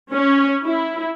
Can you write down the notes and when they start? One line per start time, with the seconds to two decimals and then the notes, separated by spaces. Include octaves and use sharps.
0.12 C#4
0.65 E4